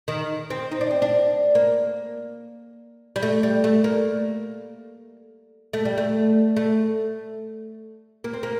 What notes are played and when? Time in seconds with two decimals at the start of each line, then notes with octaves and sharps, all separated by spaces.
0.08 D#3
0.50 C4
0.71 D#4
0.81 D4
0.91 C4
1.02 D4
1.55 A#3
3.16 G3
3.22 A3
3.43 G3
3.64 A3
3.84 A#3
5.73 A3
5.85 G3
5.98 A3
6.56 A3
8.24 A#3
8.33 C4
8.43 A#3